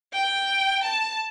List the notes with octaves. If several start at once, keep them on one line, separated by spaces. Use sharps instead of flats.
G5
A5